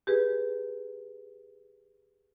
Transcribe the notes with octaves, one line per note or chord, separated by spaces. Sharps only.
G4 G#4 B4